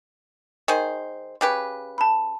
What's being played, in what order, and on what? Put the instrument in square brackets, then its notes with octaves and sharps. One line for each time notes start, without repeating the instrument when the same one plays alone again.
[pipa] D#3 G#4 C5
C#3 G4 B4
[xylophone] A5 B5